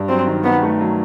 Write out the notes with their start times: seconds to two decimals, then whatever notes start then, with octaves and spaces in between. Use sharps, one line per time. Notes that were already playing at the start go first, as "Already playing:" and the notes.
Already playing: G2
0.08 F#3 C4
0.27 D#3
0.44 D#3 B3
0.62 A3
0.81 F#3